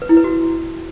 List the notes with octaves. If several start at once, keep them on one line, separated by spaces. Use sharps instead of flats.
B4
E4
B4
F#4